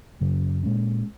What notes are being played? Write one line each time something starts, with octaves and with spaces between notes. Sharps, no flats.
F#2 C#3 F#3 C#4
A#2 G#3 C#4